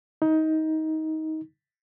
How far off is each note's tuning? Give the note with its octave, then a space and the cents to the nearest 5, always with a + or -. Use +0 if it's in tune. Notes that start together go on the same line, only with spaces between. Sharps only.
D#4 +20